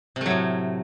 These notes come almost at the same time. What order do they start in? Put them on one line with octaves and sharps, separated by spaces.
C3 A3 F#3 A2